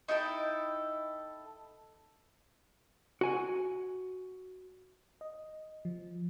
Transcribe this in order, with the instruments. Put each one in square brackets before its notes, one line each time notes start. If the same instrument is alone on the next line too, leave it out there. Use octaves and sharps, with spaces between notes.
[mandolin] D#4 E4 A4 G5
[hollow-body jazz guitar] F#4 G#5
[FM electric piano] D#5
F3